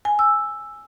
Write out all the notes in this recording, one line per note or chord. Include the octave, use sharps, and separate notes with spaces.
G#5
E6